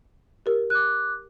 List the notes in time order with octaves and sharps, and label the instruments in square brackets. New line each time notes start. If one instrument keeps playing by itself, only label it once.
[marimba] G4 A#4
[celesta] D6 F#6